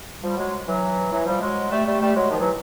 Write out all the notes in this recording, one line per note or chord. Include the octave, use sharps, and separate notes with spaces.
F3 G3
F#3 G#3
E3 F#3
E3 F#3
F3 G3
F#3 G#3
G3 A3
G3 A3
G3 A3
F#3 G#3
D#3 F3
E3 F#3